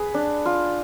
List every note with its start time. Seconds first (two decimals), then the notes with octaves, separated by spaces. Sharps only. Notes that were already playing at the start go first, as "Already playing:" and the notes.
Already playing: G#4 B4
0.14 D4
0.46 F4